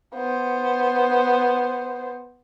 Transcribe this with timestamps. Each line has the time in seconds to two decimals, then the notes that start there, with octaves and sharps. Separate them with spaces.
0.14 B3 C5